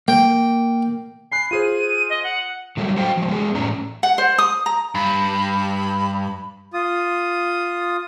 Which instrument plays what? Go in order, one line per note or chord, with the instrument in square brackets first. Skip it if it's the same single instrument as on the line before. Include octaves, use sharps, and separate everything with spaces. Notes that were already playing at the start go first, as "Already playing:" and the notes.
[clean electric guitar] A#3 [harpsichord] G5
[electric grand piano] G#5 B5 F#6 [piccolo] C7
[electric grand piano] F4 G#4 C5 [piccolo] D#7
[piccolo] D#5
F#5
[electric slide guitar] D3 F#3 G3 A3
F#4 C5 F5 G5
F3 G#3
G#3 B3 G#4
A2 C#4 D4 A#5
[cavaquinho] F#5
C5
D#6
A#5
[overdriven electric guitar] G2 [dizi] B5
[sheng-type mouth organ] F4 D#6